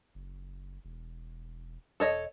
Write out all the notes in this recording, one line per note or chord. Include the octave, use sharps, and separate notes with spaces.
F#1
E1
E1 A4 C#5 D#5